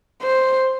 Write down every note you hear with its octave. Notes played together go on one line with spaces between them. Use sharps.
C5